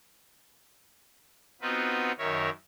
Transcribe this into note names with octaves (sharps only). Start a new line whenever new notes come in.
B3 C4 D#4 F4 F#4 B4
F#2 D#3 A#4 C#5 E5